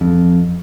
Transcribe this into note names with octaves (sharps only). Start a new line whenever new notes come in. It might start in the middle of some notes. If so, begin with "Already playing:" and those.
F2